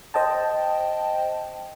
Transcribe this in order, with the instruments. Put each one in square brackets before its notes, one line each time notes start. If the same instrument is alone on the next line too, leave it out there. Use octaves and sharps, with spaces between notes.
[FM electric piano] C5 D#5 G5 A5